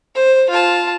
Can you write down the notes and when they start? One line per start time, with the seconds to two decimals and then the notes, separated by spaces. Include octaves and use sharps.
0.16 C5
0.50 F4 A5